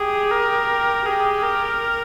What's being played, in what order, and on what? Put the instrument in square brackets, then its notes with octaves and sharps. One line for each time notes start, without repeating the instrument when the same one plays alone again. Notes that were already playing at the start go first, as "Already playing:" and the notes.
Already playing: [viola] G4 [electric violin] G#4
[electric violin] A#4
[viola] G4 [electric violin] G#4
[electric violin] A#4